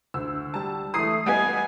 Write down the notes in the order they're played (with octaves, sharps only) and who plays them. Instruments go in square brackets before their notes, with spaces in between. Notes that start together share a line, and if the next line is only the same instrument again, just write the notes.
[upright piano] D2 [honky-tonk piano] E6
[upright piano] G3 E6 [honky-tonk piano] A5
[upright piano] E3 A3 [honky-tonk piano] D#6 C7
[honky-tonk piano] G3 B3 [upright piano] D#5 F#5 [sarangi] G#5